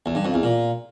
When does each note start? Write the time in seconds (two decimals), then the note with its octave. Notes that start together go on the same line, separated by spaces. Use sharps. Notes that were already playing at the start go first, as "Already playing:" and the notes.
0.06 E2
0.15 G2
0.25 F2
0.34 E2
0.43 A#2